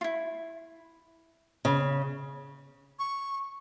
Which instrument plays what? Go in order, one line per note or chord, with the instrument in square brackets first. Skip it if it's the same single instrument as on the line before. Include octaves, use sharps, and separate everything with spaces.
[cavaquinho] E4 F4
[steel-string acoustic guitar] C#3
[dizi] C#6